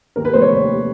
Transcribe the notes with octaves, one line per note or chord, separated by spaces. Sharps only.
D#2 A#4
B4
F1 C5
C#5
D#2